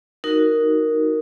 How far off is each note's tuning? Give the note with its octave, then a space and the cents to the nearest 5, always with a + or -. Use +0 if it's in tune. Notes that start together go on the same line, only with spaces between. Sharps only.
D#4 +0 F#4 +0 A#4 +0